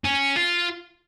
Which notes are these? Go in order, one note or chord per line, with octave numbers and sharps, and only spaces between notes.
C#4
F4